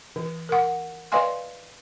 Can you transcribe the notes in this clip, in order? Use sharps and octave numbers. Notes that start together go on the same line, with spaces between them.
E3
A#4 F#5
B4 D5 D#5 F5 G#5 C6